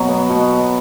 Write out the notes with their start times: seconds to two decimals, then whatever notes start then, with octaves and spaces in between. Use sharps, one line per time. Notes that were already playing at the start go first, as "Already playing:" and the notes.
Already playing: B2 F#3
0.08 B3
0.29 B2